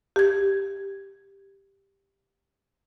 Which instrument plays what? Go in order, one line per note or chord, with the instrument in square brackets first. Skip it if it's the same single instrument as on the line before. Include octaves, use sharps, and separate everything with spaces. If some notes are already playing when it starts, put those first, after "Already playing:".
[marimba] G4 G#6